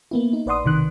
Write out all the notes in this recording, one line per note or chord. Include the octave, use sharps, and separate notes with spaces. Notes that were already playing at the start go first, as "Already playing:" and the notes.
A#3 B3 E4
D#4
A#1 B4 D5 F#5 C6 D#6
B1 C3 D#3 F#6